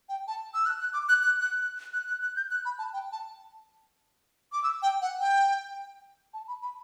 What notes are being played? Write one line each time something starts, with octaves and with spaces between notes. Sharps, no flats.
G5
A5
E6
F#6
F#6
D6
F#6
F#6
F#6
F#6
F#6
F#6
F#6
G6
F#6
B5
A5
G5
A5
D6
E6
G5
F#5
G5
A5
B5
B5